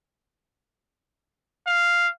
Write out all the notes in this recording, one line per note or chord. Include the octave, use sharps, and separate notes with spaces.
F5